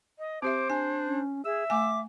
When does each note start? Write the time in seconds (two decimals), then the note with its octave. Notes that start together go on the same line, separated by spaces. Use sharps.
0.19 D#5
0.42 C4 G4 C5 E5 D6
0.70 D4 G#5
1.08 C#4
1.45 G#4 E5 E6
1.70 A3 G#5 D6